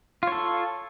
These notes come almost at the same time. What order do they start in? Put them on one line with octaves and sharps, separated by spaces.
F4 C#5 A4